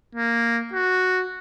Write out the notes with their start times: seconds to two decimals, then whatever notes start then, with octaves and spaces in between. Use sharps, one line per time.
0.15 A#3
0.74 F#4